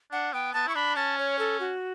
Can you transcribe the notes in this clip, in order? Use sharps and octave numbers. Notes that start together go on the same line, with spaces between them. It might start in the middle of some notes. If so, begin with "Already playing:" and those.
D4 F#5
B3 G5
B3 A5
E4 C#6
D4 B5
C#4 A5
C#5
A4
F#4